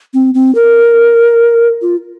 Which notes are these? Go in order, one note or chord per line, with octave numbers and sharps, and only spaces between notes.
C4
C4
A#4
F4